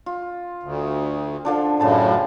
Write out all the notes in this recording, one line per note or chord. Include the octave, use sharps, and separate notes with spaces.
F4
D2
D3 F3 D4
F#2 A2 C#3 A5 B5